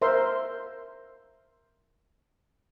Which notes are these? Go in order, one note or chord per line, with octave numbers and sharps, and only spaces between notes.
A#4 C5 E5 C6